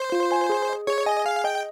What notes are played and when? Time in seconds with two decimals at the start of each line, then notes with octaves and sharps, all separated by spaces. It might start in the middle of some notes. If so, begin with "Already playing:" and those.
Already playing: C5
0.12 F4
0.32 G#5
0.50 G#4
0.69 D#5
0.87 G#4 C#5
1.06 D#5 G#5
1.25 G#4 F5
1.44 D#5 G5